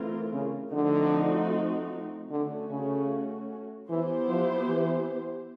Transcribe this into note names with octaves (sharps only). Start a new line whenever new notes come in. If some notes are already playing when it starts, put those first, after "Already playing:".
Already playing: E3 A3 C4 F4 A#4
C#3
D3 F3 A3 C4 D#4 F#4
D3 A3 C#4 F#4
C#3
E3 B3 E4 G4 C5
F3
E3